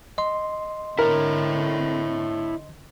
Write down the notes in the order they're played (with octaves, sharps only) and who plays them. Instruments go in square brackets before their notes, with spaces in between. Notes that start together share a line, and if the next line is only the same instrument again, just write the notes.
[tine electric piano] D#5 C6
[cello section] D3 C4 [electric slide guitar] E4 C#5 [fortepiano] A#4